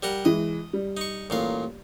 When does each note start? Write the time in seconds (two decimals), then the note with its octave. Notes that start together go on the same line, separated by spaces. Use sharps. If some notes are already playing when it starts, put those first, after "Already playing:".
0.03 G3 A#4 F#5
0.25 E3 G#3 D#5
0.73 G3
0.97 D#4 C#6
1.30 A1 A#2 F5